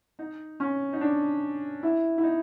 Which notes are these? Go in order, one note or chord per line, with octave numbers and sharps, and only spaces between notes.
D#4
C#4
D#4
D4
E4
E4
D#4